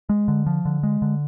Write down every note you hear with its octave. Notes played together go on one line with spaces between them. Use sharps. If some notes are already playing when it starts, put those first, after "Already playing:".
G#3
D3
F3
D3
G#3
D3